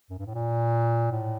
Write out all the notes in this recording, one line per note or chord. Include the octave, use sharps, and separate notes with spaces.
F#2
G2
A2
A#2
A2